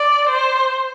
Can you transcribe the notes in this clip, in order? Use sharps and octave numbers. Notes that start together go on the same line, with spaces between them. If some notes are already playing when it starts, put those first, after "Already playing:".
Already playing: D5
C5